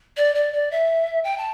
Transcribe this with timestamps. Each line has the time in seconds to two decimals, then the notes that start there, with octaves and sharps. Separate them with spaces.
0.17 D5
0.35 D5
0.53 D5
0.71 E5
1.24 G5
1.38 A5